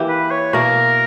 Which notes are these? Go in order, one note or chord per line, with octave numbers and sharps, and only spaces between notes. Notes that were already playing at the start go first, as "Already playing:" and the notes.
Already playing: E3 A#3 E4 G4
B4
C#5
B2 A#3 E4 A#4